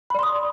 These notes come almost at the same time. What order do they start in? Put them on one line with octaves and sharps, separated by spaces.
B5 D5 C6 D#6